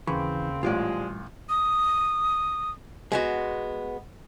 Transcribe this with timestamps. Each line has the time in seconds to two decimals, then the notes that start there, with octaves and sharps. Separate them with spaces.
0.07 D#2 C#3 E3 A#3 C4 B5 C#6
0.63 A1 A#2 F3 G3 G#3 F4 G4 D5
1.49 D#6
3.12 G#3 B3 F#4